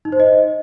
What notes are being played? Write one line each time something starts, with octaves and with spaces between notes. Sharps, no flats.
D#4
C5
D#5